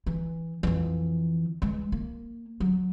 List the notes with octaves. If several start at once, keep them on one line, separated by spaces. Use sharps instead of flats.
E3
F2 E3
E3 G#3
A#3
F#3